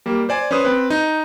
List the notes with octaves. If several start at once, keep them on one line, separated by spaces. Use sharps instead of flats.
G3 A#3
C5 D5 G#5
C#4 B4 C5 D#6
C4 B4
D#4